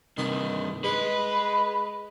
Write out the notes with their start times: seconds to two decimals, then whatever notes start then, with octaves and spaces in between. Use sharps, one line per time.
0.18 G2 C3 D#3
0.84 G#3 B4